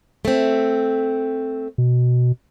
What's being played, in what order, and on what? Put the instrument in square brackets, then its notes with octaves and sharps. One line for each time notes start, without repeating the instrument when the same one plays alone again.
[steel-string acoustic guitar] A3 C4
[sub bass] B2